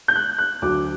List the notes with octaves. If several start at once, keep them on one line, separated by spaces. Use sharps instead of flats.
G6
F#6
F#6
D2 D3 F#3 D6